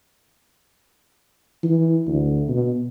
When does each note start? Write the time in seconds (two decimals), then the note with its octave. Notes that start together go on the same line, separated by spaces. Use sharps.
1.63 E3
2.07 D2
2.49 B2